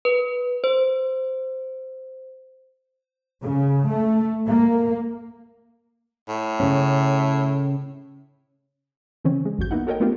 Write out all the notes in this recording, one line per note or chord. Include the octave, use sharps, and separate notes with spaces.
B4
C5
C#3
A3
A#3
A2
C#3 C#4
C#3 E3 C4 C#4
G#3
A1 E2 G2 F#4 G6
A#3 B3 D#4 E4 F#5
F#4 A4 A#4 C#5 D#5 G5
A3 B3 C4 D4 F4 G4